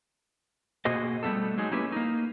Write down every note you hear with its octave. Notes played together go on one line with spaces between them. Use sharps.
B2 A#3 F#4 G#4 C5 D#5
G3 A3 B3 F4 A4
F#3 G#3 D#4 G#4
A#3 C#4 E4 G4 B4
A#3 D#4